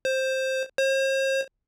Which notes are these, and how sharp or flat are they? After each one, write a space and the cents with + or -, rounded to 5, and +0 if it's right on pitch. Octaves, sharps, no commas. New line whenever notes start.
C5 +10
C5 +45